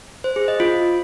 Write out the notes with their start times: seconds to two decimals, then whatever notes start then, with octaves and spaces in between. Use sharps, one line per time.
0.24 C5
0.36 G#4
0.48 D#5
0.60 F4